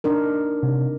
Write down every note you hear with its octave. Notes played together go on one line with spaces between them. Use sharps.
D4 D#4 A#4
C3